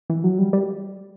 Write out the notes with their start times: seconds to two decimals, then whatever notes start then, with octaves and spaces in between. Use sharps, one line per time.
0.10 E3
0.24 F#3
0.39 G3
0.53 G3